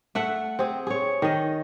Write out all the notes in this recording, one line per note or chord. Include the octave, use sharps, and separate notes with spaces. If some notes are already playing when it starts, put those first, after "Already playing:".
A3 E5 F#5
C4 G#4
G#4 C#5
D#3 D#5